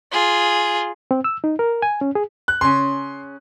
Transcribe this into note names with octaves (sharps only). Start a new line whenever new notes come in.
F4 G#4
C4
E6
D#4
A#4
G#5
C#4
G#4
F#6
C#3 C#4 C6